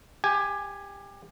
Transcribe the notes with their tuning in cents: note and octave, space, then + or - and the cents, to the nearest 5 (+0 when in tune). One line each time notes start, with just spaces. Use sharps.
G4 +20 G#5 +0